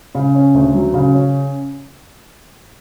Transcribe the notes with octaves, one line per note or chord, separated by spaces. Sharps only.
C#3
C#4
D2
F#3
C#3
C#4